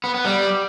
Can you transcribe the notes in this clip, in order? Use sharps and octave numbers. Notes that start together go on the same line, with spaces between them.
B3
B3
G3